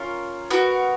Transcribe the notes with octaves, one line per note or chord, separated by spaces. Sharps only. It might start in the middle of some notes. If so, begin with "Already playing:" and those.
Already playing: C#4 F4 A#4
B3 F#4 A#4